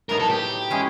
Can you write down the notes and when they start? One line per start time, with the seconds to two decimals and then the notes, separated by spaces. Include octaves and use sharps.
0.09 A2 F#3 B3 D#4 A#4
0.20 A4
0.30 G4
0.70 G#3 C#4 E4 G#4